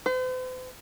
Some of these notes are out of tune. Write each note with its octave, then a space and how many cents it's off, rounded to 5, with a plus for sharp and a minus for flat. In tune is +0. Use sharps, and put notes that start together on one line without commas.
C5 -45